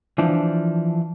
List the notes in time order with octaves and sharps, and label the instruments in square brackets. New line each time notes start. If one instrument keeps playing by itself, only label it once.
[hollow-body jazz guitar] E3 F3 D4